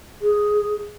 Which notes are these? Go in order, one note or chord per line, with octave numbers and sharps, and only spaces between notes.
G#4